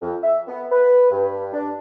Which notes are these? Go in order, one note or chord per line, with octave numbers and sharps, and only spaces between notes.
F2
E5
B3
B4
G2
D4